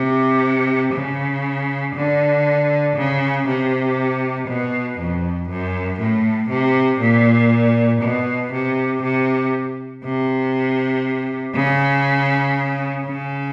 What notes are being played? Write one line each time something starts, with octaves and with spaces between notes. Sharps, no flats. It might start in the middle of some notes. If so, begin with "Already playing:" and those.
Already playing: C3
C#3
D3
C#3
C3
B2
F2
F#2
A2
C3
A#2
B2
C3
C3
C3
C#3
C#3